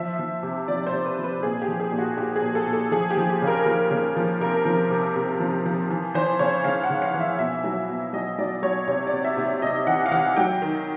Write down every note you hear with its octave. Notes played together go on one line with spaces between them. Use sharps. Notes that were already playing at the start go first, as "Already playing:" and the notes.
Already playing: F3 E5
F3
C3
F3 D5
C5
C3
B4
F3
B4
A#2 G#4
G4
F3
G#4
A#2
F#4
A#2 G4
G#4
A#2
A4
A#2
A4
F3 G#4
G4
F3
G4
C#3
A#4
F3 A#4
C#3
F3
C3 A#4
F3
C3
C3
F3
F3
E3
E3 C5
C#3 C#5
C#3 F5
F#5
C#3
F5
E3
E5
B2 E5
F#3
B2
F#3 D#5
F#3 D5
F#3 C#5
C3 C#5
D5
C3
E5
C3
E5
C3 D#5
E3 F#5
F5
E3 F#5
F#3 G5
D#3